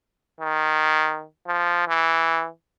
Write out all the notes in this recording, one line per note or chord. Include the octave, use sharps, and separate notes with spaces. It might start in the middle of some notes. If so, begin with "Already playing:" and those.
D#3
F3
E3